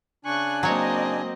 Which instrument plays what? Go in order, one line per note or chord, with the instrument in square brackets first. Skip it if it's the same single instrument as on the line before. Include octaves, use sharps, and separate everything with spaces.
[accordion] C#3 D4 G#5 [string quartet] C#6 F#6
[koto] F#3 C#5 [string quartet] A#3 C4 D#5